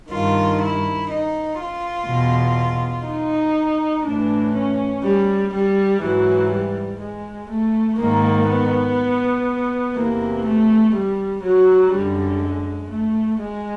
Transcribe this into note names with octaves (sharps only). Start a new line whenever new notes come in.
G2 D#3 F4
E4
D#4
F4
E2 B2
D#4
A2 E3 D4
C#4
G3
G3
G#2 E3 F#3
G3
G#3
A3
G#2 D#3 A#3
B3
E2 C3 E3 A#3
A3
G3
F#3
F#2 D3 G3
G#3
A3
G#3